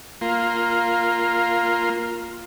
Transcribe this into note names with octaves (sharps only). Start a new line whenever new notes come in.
A#3 F4